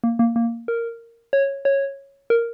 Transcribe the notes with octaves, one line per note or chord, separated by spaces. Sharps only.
A#3
A#3
A#3
A#4
C#5
C#5
A#4